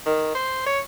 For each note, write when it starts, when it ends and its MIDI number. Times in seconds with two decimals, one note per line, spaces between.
0.06 0.31 51
0.35 0.61 72
0.67 0.80 73